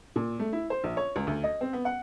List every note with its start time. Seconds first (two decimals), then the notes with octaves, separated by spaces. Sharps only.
0.16 A#2
0.39 A3
0.53 E4
0.70 C5
0.84 A#1
0.97 C#5
1.16 C#2
1.27 D2
1.44 D#5
1.61 C4
1.73 B3
1.85 F#5